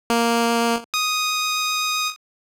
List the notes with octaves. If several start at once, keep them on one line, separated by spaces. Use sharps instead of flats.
A#3
D#6